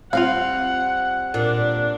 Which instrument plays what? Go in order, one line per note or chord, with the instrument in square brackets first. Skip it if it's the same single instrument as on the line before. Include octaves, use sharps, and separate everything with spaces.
[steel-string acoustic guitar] G3 C4 [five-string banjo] F4 F5 [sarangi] F#5
[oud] A#2 [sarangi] D4